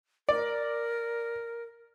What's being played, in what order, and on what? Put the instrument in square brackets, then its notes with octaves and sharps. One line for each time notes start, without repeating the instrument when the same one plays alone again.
[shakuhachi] A#4 [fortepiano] D5